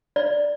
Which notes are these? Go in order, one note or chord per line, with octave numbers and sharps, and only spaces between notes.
D5